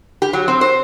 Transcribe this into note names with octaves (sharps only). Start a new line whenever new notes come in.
G4
F#3
C4
C5